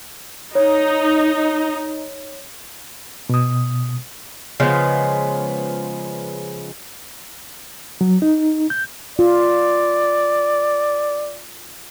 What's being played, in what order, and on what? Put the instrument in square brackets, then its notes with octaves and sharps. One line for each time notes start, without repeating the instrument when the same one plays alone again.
[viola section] D#4 [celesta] C#5
[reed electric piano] B2 D#6
[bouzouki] C#3 F3 G#3 B3
[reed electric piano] F#3
D#4
G6
[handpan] F4 [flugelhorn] D5